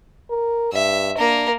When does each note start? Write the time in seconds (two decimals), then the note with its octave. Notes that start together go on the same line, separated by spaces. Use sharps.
0.30 A#4
0.73 G2 E5
1.18 A#3 D4 A#4